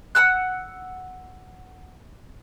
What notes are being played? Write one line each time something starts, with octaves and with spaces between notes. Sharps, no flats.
F#5 A5 E6 F#6